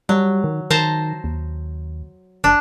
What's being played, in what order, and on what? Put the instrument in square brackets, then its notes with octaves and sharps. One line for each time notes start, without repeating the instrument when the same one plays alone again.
[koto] F#3 [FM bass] G3
[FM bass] D#3
[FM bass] D#3 [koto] C5 A5 A#5
[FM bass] D#2
[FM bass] F#1 [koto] D4